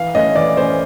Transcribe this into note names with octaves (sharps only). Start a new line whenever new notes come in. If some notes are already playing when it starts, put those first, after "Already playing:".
Already playing: E3 F5
A3 C#4 D#5
E3 D5
A3 C#4 C5